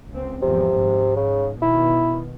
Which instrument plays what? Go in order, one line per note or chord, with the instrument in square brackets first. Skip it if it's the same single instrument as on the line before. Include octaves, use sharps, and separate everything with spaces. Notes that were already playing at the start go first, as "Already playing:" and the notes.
[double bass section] C#2 C4
[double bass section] G#1 E2 F3 [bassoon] C3
[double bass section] G#2
[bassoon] C#3
[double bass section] B2 D#3 [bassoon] E4